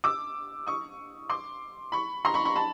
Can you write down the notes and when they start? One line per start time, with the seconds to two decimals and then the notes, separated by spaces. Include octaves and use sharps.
0.04 D6 E6
0.67 C#6 D#6
1.30 C6 D6
1.92 B5 C#6
2.25 A#5 C6
2.34 B5 C#6
2.45 B5 C#6
2.55 A5 B5